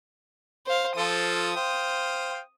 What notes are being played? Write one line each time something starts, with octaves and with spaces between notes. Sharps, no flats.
C5 F5
F3 F4 A4 D#6
C5 F5 G5